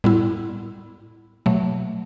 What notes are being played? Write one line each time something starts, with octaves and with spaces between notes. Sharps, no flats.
A2 G3 B3 E4
B2 F#3 A3